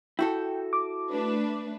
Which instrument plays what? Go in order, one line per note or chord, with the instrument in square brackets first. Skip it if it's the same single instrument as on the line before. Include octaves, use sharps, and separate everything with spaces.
[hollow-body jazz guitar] E4 F#4 A4 [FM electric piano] G5
[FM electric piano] D6
[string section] A3 D4 B4